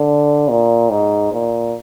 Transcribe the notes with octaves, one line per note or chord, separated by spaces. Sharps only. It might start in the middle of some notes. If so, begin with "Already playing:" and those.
Already playing: D3
A#2
G#2
A#2